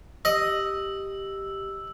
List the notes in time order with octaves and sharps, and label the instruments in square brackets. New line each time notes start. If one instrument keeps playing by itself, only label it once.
[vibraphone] G4 [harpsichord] D#5 [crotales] E6